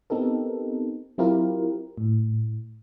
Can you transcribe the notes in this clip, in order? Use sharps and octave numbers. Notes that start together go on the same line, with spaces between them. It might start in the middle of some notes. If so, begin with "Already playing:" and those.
B3 C4 D#4 G4 A4 A#4
F#3 C4 E4 F4 G4 A#4
A2